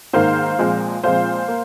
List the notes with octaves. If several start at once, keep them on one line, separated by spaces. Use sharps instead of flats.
G#2 D#3 A#3 C5 F5
A#2 F3 G#3 C4
A#2 F3 G#3 C4 C5 F5
A#3